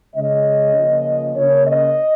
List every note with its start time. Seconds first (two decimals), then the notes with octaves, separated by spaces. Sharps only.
0.15 C#3 G#3 C#4 D#5
0.76 C#3 F3 A#3 C#4
1.37 C#3 A#3 C#4 C#5
1.67 D#5